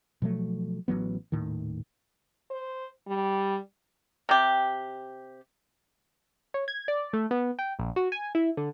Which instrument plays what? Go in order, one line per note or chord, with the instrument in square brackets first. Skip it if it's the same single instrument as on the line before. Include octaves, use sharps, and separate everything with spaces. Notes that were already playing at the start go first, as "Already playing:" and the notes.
[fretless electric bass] B2 F3 F#3 A3
A1 D#3 F#3 B3
D#1 A2 D#3
[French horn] C5
G3
[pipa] C3 G4
[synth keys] C#5
G#6
D5
A3
B3
G5
A#1
F#4
G#5
E4
D3